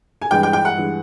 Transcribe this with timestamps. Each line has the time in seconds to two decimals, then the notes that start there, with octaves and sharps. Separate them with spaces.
0.22 G#5
0.31 G2 E3 G#3 G5
0.43 G5
0.53 G5
0.65 F#5
0.77 G2 E3 G#3